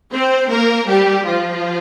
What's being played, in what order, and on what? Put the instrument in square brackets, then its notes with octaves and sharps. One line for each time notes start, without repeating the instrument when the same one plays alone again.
[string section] C4 C5
A#3 A#4
G3 G4
F3 F4